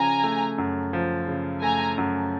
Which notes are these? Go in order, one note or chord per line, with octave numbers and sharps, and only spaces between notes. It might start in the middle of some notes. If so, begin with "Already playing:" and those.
Already playing: C#3 F3 G#5 A#5
A3
F#2
F3
C#3
A3 G#5 A#5
F#2